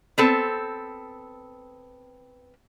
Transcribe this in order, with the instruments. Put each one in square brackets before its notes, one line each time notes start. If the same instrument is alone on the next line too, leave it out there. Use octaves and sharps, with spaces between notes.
[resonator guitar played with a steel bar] B3 C4 A4